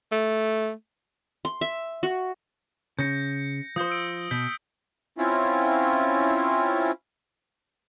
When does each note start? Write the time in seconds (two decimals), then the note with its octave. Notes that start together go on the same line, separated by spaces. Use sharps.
0.12 A3
1.45 C6
1.61 E5
2.03 F#4
2.99 C#3 G6 A#6 C#7
3.76 F3 C5 D#6 G6 G7
3.90 E6 D7
4.31 B2 G6 B6 G7
5.18 C4 C#4 E4 F4